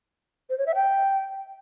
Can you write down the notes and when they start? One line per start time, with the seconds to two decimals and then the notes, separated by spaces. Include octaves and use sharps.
0.50 C5
0.58 C#5
0.67 E5
0.75 G5